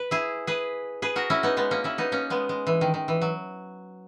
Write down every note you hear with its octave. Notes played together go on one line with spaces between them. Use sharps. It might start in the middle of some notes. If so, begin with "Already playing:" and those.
Already playing: B4
E4 G#4
G#4 B4
G#4 B4
F#4 A#4
C#4 E4
B3 D#4
G#3 B3
A#3 C#4
C#4 E4
B3 D#4
A#3 C#4
G#3 B3
G#3
E3
D#3
D#3
E3
F#3